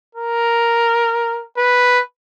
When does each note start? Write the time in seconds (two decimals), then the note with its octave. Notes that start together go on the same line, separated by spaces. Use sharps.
0.15 A#4
1.57 B4